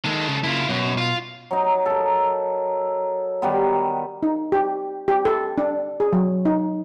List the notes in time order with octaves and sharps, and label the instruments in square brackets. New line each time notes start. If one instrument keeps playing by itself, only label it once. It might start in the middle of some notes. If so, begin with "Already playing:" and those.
[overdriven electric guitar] D#3 D#4 [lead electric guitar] G#3 A4
[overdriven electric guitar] C#3
[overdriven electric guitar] C#3 A#3 [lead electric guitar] E4 F4
[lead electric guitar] F#2 [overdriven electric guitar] B2
[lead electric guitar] F4
[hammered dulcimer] F#3 D#4
A4 A#4
D#3 G3 B3
[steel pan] D#4
G4
G4
A4
D4
G#4
F#3
D#4